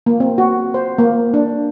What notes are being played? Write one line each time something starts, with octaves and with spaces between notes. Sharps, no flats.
A#3
C4
F#4
C5
A#3
D4